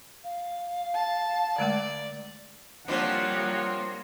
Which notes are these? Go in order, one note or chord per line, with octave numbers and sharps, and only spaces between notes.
F5
A5
D3 G#3 A3 D5
F3 G3 A#3 C4 D4 F4 C#5 F#5